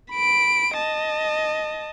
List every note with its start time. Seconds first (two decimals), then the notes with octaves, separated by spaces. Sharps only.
0.12 B5 D7
0.76 D#5 A5